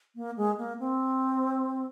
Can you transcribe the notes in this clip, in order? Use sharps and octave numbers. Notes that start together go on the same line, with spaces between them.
A#3
G#3
A#3
C4